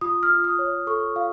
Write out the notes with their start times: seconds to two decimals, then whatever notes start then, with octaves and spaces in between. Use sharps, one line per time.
0.01 F4 D#6
0.23 F6
0.30 F4
0.44 D#6
0.59 C#5
0.87 A4 C#6
1.16 F4 F5